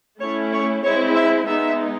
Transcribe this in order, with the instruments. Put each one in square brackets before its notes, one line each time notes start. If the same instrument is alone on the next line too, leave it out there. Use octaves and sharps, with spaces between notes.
[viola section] A3 C#4 E4 C#5
C#5
G#3 C4 E4 C#5
E5
G#3 B3 D#4 E5